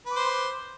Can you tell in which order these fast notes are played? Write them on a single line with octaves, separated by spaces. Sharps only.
B4 D6 C5